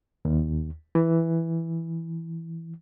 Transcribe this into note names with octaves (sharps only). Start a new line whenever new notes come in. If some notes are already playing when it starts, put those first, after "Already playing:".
D#2
E3